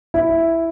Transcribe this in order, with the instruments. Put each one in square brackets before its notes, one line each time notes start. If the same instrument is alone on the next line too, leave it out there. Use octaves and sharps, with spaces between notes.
[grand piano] E4